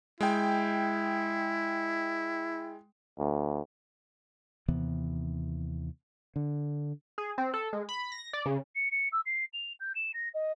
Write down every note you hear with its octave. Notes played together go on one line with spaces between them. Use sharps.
G#3 E4 G5
D2
D#2 C3 E3 B3
D3
G#4
C4
A4
G#3
B5
A#6
D5
C#3
C#7
C#7
E6
C7
F7
G6
E7
A#6
D#5